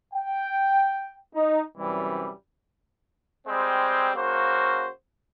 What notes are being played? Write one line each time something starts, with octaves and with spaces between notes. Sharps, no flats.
G5
D#4
F#2 C3 E3 G3
G3 G#3 C4
C#3 A#3 F#4 C5